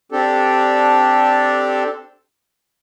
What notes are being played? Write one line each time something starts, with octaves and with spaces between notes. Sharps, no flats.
C4 D4 G4 A4